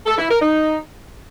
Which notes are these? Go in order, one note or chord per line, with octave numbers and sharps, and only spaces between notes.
A4
E4
A#4
D#4